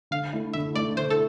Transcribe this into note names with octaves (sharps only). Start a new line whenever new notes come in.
D3 F5
A3 E4
D3 E5
A3 E4 D5
D3 C5
A4